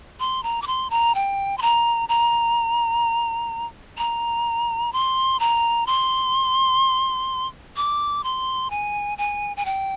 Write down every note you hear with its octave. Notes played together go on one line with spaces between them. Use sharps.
C6
A#5
D6
C6
A#5
G5
C6
A#5
A#5
A#5
C6
A#5
C6
D6
C6
G#5
G#5
G#5
G5